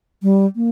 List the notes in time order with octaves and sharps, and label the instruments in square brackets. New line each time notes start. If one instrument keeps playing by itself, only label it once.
[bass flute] G3
A#3